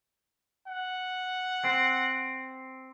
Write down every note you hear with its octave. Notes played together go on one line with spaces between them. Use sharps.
F#5
C4